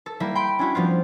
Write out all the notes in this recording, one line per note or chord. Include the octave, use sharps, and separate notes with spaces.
A4
G3 A#3 E4 E5
G5 B5 C6
C#4 D4 E4 F#4
F3 G3 B3 F4